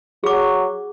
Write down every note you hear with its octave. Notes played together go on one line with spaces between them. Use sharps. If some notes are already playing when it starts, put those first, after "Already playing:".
F#3 G#4 D6